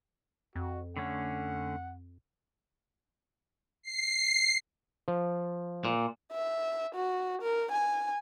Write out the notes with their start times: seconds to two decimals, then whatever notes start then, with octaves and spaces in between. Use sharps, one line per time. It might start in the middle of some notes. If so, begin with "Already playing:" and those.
0.55 F2 F#4
0.97 D3 A3 C#4 F#5
3.82 C7
5.08 F3
5.85 A#2
6.32 E5
6.95 F#4
7.42 A#4
7.72 G#5